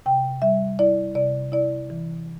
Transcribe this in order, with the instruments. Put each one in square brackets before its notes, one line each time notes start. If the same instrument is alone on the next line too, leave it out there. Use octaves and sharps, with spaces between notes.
[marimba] C3 G5
G3 E5
E4 D5
C3 D5
E4 D5
E3